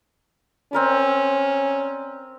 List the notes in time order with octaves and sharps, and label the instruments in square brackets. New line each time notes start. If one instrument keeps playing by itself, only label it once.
[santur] C4 A#4 D5 [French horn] C#4